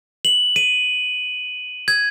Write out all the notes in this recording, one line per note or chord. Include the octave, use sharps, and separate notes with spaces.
F#7
D#7
G#6